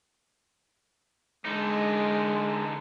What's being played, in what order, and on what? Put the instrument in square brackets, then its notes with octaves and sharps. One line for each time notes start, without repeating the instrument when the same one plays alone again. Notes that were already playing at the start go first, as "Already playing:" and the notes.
[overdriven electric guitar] D3 D#4 [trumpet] G#3